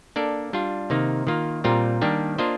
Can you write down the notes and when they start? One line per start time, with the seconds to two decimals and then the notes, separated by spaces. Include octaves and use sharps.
0.16 A#3 D4 A4 D5
0.53 G3 D4 F4
0.90 C3 D#3 A#3 D#4
1.27 D#3 A#3 F4
1.64 A#2 G3 C4 F4 A#4
2.01 D#3 G3 A#3 D4 G4
2.38 A#3 D4 F4 C5 D#5